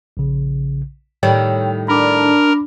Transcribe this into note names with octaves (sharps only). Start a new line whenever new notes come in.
A#1 C#3
A2 D#3 G3 C#5 G5
D4 A#4 B5 D6